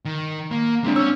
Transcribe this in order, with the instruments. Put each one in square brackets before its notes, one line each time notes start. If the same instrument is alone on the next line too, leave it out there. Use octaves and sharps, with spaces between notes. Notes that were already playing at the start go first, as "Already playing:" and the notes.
[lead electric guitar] D#3
A#3
[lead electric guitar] G#3 E4 [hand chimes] C4 D4
[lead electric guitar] C#4 C#5 [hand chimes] E6